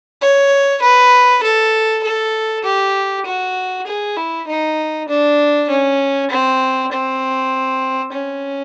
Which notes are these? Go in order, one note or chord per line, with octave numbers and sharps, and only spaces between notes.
C#5
B4
A4
A4
G4
F#4
G#4
E4
D#4
D4
C#4
C4
C4
C#4